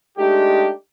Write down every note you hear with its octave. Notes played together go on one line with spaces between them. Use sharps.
G#3 A3 D4 D#4 G4